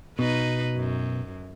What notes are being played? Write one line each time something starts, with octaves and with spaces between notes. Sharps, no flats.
B2 D#4 B4
F#2